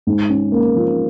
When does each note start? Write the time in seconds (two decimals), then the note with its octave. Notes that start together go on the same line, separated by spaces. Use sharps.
0.07 G#2
0.30 C#4
0.52 A#3
0.76 F3